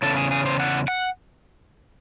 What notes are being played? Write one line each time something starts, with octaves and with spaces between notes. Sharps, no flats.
E2 C#3 A4
G#4
G#4
C5
F#5
F#5